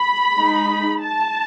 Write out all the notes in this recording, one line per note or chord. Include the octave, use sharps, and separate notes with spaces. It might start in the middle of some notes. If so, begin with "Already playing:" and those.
Already playing: B5
G#3 D#4
A5